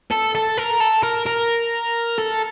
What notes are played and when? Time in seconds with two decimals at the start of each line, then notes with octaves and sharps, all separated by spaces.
0.11 A4
0.35 A4
0.58 A#4
0.80 A4
1.03 A#4
1.26 A#4
2.18 A4